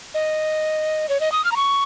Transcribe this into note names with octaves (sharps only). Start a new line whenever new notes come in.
D#5
C#5
D#5
D#6
F6
A#5
C#6